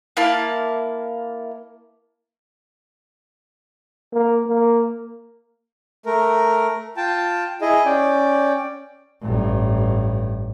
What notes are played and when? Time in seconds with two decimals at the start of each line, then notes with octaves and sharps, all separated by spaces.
0.17 A#3 E4 F5 A5
4.12 A#3
4.47 A#3
6.06 A3 A#4
6.97 F4 G5 A5
7.62 E4 G#4 D#5
7.85 C#4 D5 G5
9.22 A1 G2